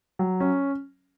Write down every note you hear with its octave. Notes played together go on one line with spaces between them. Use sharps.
F#3
C#4